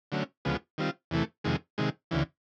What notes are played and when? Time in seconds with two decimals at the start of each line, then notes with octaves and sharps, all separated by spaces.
0.12 D3 F#3 A3 C#4
0.45 D2 C#3 F3 G#3 B3
0.78 D#3 G3 C4 F4
1.11 E2 C3 E3 A3
1.44 F2 C3 D#3 G#3
1.78 C3 D#3 G#3
2.11 D2 C#3 E3